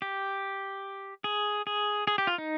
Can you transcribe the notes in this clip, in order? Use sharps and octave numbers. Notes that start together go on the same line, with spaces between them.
G4
G#4
G#4
G#4
G4
F4
D#4